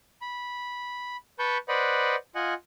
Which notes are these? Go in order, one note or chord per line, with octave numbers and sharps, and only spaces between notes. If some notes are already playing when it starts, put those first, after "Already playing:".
B5
B4 A5 B5 C#6 G6
B4 C5 D5 D#5 F#5 B5
F4 D#5 F#5 G#5